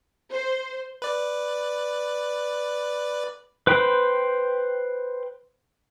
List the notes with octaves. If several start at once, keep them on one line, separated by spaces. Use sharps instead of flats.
C5
B4 D5
B4 C5 G5 B5